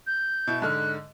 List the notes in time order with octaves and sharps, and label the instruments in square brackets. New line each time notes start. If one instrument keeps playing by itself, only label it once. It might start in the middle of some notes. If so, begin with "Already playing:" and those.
[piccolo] G6
[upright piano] B2 E4
[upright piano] G#2 D3 F6 [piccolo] F#6